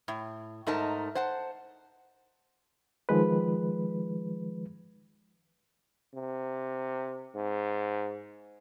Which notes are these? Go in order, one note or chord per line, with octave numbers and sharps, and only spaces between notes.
A2
G#2 A3 D#4 A#4 A5
C5 F#5 A5
D#3 F3 G#3 B4
C3
G#2